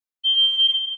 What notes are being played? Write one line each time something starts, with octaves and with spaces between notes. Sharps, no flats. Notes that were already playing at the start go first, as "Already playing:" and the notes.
G7